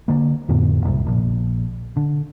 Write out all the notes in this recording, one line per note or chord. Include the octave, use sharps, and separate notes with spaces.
D3 A#3
F2 A2 D3 B3
F#1 C2
A#1
D3